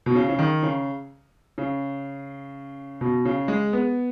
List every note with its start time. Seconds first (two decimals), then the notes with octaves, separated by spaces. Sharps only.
0.06 B2
0.15 C#3
0.29 C#3
0.39 D#3
0.63 C#3
1.58 C#3
3.01 B2
3.25 C#3
3.48 G#3
3.73 B3